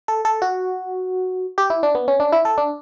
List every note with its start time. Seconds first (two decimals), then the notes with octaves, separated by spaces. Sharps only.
0.08 A4
0.25 A4
0.42 F#4
1.58 G4
1.70 E4
1.83 D4
1.95 B3
2.08 C#4
2.20 D4
2.32 E4
2.45 A4
2.58 D4